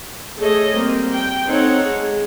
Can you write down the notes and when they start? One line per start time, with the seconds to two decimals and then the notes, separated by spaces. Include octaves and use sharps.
0.38 A3 G#4 A4 C#5 D#5
0.74 G3 A#3 C4
1.14 G5
1.48 C4 D#4 A4 C#5 F#5
1.86 G#3